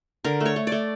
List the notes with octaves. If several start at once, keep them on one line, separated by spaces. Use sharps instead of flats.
D3 A#4
A3
C#5
A3
A3 D5